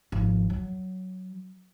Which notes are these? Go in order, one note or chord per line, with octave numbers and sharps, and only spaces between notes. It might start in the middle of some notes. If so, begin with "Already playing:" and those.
G#1 F3
F#3